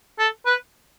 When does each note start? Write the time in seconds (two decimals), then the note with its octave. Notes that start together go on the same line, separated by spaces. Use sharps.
0.19 A4
0.46 B4